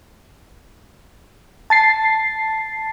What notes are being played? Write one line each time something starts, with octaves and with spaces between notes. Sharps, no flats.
A5 A6 C7